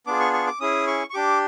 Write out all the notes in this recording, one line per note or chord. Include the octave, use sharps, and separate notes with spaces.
B3 D4 F4 G#4 D6
C#6
C#6
D6
C#4 E4 G#4 D#6
C#6
C#6
D4 G4 D6